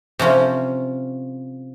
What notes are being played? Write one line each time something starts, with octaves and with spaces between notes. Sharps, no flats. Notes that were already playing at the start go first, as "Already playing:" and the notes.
C3 F3 C#4 F4